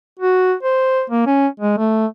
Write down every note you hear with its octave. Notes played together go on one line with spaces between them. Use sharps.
F#4
C5
A#3
C#4
G#3
A3